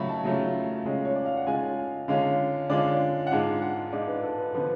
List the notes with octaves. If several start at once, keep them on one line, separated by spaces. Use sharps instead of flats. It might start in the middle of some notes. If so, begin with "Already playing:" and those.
Already playing: C#3 F#3 A3 F4 B5 C#6
A5
C#3 F#3 A3 F4
C#3 G#3 C#4 F4
C#5
D5
F5
F#5
C#3 G#3 C#4 F4 G#5
D3 G#3 C#4 F4 F5
D3 G#3 C#4 F4 D5
F#5
G#2 G#3 D4 F4 F5
F#5
G#2 G#3 D4 F4 D5
B4
A4
B4
D3 F3 B3 F4 B4